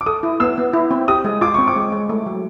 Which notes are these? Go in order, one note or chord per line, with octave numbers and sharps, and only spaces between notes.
D6
A4 D#6
E4
B3 E6
B3
E4
C4
G4 D#6
G#3
F4 D6
C4 C#6
D6
G#3
G#3
A3
F#3